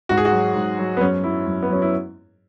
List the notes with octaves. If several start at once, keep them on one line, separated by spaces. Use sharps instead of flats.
G#2 F#4
G#4
F#4
F#3
G#2
F#3
B3
F#2 C#4
F#3 E4
F#2
B3
F#3 C#4
E4